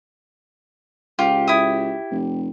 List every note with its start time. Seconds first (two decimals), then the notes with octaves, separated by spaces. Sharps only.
1.19 C#2 F4 G4
1.47 E4 D#6
2.11 F1